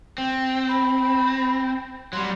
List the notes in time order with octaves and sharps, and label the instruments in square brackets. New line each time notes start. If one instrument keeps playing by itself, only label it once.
[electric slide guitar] C4 [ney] G5
[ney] B5
[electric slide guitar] F#3 G3 [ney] C6